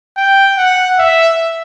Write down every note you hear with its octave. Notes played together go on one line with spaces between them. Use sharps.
G5
F#5
E5